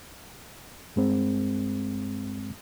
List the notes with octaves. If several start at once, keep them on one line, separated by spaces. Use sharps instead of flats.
G2 G#3 C4